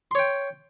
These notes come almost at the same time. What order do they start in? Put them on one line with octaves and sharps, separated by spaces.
C6 C#5 G5